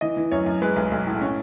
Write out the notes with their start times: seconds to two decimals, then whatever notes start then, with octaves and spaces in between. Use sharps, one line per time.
0.01 E3 D#5
0.17 E3
0.31 F#2 C#5
0.46 F#2
0.62 G#3 B4
0.76 B1
0.91 B1
1.07 A2
1.21 C#4